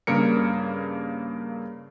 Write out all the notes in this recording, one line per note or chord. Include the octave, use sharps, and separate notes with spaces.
G2 C#3 A#3 A#4 C#7